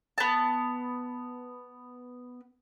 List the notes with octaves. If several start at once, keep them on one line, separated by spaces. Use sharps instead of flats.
B3 A5